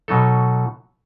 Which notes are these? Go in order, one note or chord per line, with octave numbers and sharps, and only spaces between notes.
B2 F#3 D#4 A4